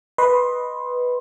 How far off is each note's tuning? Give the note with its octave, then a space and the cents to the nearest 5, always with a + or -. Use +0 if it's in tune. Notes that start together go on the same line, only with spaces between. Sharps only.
B4 +0 D#5 +0 C6 +20